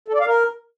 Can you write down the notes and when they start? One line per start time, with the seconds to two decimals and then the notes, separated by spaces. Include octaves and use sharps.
0.08 A4
0.14 D5
0.20 F5
0.26 A#4